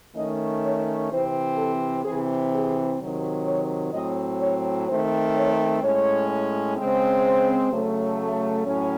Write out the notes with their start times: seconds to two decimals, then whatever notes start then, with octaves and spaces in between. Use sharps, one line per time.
0.16 D#3 A3 C#4 D#5
0.63 C#5
1.10 C3 E3 C4 C5
1.58 A4
2.05 C3 E3 C4 G#4
2.53 G#4
3.00 C3 D#3 F#3
3.46 C#5
3.94 A2 F#3 C4 D#5
4.41 C#5
4.88 D#3 A3 C4 C5
5.36 C#5
5.83 A2 G#3 C#4 C#5
6.78 C#3 G#3 C4
7.25 C5
7.72 C#3 F#3 A3
8.66 A2 F#3 C#4